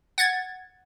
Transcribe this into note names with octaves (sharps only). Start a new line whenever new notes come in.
F#5 G#6 A6